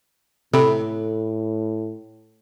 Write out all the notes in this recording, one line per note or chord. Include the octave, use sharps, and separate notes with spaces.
A2 C3 E4 A4 B4